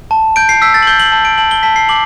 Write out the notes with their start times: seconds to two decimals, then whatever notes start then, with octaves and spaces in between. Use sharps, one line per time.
0.11 A5
0.36 G6 D7
0.49 C7
0.62 E6 B6
0.74 A6
0.82 F#7
0.87 G6 G7
1.00 F#7
1.12 A5
1.25 D7
1.38 A5 F#7
1.51 G7
1.63 A5 B6
1.76 C7
1.89 D6 F#7